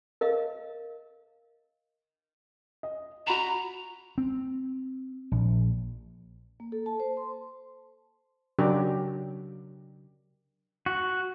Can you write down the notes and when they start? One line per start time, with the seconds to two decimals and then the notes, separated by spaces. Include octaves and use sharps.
0.21 A#4 D#5 F5
2.83 D#5
3.27 F#4 A#5 B5 E7
4.18 C4
5.32 A#1
6.60 A#3
6.72 A4
6.86 A5
7.00 C5
7.17 C6
8.59 C#3 F#3 D4 G4 A#4
10.86 F#4